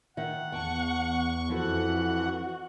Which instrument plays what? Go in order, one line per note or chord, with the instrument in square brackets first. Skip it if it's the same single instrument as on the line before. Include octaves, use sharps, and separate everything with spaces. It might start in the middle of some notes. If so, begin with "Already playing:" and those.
[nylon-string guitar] D#3 E5 [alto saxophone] F#5
[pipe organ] E2 C#6 [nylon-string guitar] G5 A5
[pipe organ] F2 E3 F#5 [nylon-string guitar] F3 E4 A4 [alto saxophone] F#4